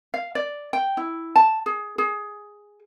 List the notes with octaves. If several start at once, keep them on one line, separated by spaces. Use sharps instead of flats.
F5
D5
G5
E4
A5
G#4
G#4